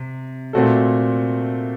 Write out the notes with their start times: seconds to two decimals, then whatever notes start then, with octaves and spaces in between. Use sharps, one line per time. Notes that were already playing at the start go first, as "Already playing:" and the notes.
Already playing: C3
0.53 A#2 A3 C4 F#4 A4